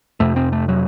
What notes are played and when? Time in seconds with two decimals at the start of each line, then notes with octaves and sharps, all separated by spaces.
0.20 F2 C3 A3
0.36 C4
0.53 A3
0.69 F#3